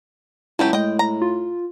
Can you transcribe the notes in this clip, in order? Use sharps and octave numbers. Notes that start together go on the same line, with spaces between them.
C#2 F#3 A3 E4 G4
A2 G#3 D#5 G5
A#5
F4